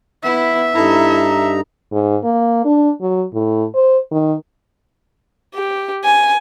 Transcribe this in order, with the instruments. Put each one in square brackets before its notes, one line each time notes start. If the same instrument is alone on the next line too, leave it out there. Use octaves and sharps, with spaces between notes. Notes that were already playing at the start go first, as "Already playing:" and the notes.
[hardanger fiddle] B3 E4 [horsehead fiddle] E5
[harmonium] G2 D#4 A#5 [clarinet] E4 [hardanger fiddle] A4
[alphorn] G#2
A#3
D4
F#3
A2
C5
D#3
[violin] G4
G#5